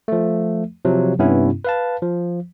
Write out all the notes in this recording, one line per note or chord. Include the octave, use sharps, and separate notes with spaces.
F3 A3
C3 F3 F#3
G2 C3 B3 C#4 E4
B4 F5 A5
F3